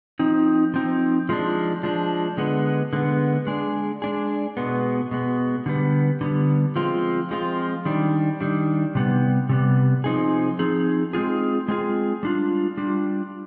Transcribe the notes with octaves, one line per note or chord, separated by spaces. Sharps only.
F3 C4 D#4
F3 C4 D#4
F3 G#3 D4
F3 G#3 D4
D3 G#3 B3
D3 G#3 B3
G#3 D4 G#4
G#3 D4 G#4
B2 G#3 B3
B2 G#3 B3
D3 G3 B3
D3 G3 B3
F3 G#3 C4 F4
F3 G#3 C4 F4
D#3 G3 D4
D#3 G3 D4
C3 G3 B3
C3 G3 B3
F3 C4 D#4 G#4
F3 C4 D#4 G#4
G#3 C4 F4 G#4
G#3 C4 F4 G#4
G3 D4 F4
G3 D4 F4